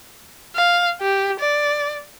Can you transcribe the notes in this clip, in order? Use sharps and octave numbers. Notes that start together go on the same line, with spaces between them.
F5
G4
D5